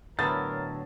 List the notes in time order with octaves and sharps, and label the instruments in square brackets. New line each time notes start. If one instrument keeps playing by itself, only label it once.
[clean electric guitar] A2 D3 F#3 [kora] B3 E4 [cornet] A#4 [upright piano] A6